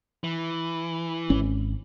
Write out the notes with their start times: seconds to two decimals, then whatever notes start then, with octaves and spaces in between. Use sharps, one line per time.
0.24 E3
1.30 G#1 C#4